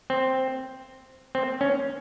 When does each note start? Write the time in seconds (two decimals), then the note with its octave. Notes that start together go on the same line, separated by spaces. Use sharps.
0.10 C4
1.35 C4
1.61 C#4